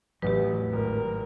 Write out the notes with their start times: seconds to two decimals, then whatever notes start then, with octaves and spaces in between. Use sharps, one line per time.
0.22 A1 E2 A2 F#3 G4 B4
0.73 G#1 A#4